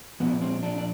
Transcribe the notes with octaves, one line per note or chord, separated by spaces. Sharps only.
A#2 F3 B3
C4
D4
D4